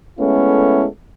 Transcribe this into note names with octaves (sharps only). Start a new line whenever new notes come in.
G#3 A3 B3 C#4 E4 A4